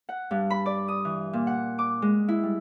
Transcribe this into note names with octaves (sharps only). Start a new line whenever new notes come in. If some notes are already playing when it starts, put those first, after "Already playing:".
F#5
G2
B5
D5
D#6
E3
A#2
F#5
D6
G#3
E4
G3